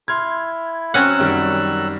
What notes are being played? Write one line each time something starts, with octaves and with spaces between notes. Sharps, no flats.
E4 C6 F6 G#6
F#3 C4 C#4 F#5 E6 F#6
F#2 D#3 G3